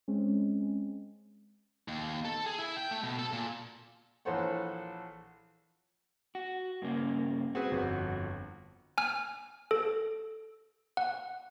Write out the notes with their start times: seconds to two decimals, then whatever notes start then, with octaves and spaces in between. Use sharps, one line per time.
0.08 G#3 C4 C#4
1.88 D#2
2.25 A4
2.46 G#4
2.58 E4
2.77 G5
2.91 A3
3.04 B2
3.19 A4
3.33 A#2
4.25 A#1 E3 A4 C5 C#5 F#5
6.35 F#4
6.82 G2 C#3 A#3
7.55 C4 F#4 G#4 B4
7.71 G1 F2 F#5
8.98 G#5 F6
9.71 A4
10.97 F#5